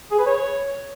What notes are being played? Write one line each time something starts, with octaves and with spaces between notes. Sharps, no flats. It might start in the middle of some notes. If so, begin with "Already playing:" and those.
G#4
B4
C#5